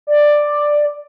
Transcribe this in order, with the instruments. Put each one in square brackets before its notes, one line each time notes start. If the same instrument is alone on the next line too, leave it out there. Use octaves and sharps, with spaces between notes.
[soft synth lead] D5